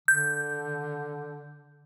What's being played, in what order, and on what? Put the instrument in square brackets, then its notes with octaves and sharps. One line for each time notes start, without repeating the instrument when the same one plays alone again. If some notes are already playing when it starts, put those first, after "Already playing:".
[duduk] D3 [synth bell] G6